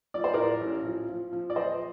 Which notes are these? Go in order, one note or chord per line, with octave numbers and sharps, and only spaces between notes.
F3 D5
C5
A2 A#4 D5
A1
F3
F3
F3
D5
F3 C5 D#5